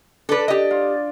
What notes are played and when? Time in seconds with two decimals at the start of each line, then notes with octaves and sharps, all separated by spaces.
0.29 D4 A4 B4 D5
0.48 G4 D#5
0.71 F4